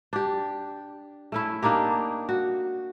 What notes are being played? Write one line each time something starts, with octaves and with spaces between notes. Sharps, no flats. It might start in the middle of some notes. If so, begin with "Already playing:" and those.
D4 G4
A3 C#4 E4
A#3 D4 D#4 G4
F#4